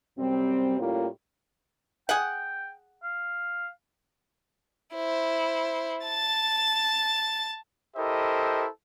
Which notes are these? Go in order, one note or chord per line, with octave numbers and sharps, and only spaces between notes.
F#2 C3 G3 C4
A2 G3 A#3 C#4 F4
G#4 F#5 G5
F5
E4 C5
A5 A6
E4 G4 A4 A#4 C5 D#5